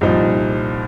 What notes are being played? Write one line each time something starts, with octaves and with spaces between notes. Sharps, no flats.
C2 A#2 F3 D#4